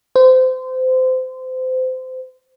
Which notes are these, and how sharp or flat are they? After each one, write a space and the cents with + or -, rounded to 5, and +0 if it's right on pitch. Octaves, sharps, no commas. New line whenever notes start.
C5 -25